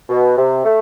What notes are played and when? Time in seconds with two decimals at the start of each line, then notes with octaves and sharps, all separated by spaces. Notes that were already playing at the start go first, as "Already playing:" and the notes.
0.09 B2
0.37 C3
0.64 A3